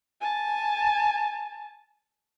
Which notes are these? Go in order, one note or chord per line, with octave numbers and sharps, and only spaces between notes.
G#5 A5